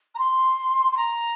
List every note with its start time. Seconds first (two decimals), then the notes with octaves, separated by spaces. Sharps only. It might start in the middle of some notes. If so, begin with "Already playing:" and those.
0.14 A#5
0.18 C6
0.91 C6
0.97 A#5